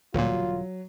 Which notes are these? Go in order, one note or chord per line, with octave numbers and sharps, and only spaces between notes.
E1 D2 A#2 D3 F#3 G3 F4